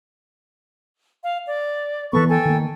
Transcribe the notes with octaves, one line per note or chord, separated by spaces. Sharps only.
F5
D5
E3 F#3 B3 A4 B4 C#6
A4 G5 G#5
D#3 A#3